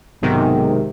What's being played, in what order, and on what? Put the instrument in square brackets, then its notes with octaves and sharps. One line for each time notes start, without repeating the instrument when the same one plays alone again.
[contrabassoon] B1 [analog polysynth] G#2 C3 D#3